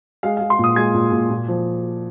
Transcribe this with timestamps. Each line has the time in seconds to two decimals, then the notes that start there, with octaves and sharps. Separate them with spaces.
0.23 G#3 F5
0.37 F5
0.41 G#3
0.50 C6
0.59 A#2 D#6
0.76 G#3 G#6
0.94 A#2
1.12 A#2
1.30 A#2
1.48 F3